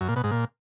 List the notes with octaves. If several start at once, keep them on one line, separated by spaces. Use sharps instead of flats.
F#2
A#2
B2
G#2
A#2